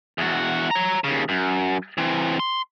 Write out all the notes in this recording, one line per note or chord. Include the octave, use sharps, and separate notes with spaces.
E2 F#4
C#5 A#5
D#2 C#3
F#2
E3 C4
C6